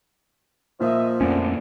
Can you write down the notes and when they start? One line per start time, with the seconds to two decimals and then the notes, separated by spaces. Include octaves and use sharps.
0.80 A#2 F3 C#5 D#5 E5
1.21 F2 D3 A3 C#4